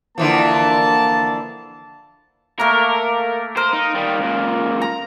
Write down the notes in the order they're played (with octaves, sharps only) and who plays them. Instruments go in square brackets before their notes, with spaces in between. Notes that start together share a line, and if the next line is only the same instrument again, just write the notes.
[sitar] D3 E3 F3 [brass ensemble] A#3 A5
[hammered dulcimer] A3 A#3 [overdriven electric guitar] A#4
[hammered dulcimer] A#4 [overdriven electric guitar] C5
[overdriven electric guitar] D#4
D#3 G3
C#2 A#2
[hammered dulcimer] A#5